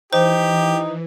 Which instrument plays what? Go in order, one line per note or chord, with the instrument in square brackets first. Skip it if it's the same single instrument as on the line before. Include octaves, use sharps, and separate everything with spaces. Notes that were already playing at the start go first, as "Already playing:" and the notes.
[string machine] E3 [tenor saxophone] D#4 [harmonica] G4 [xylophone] C5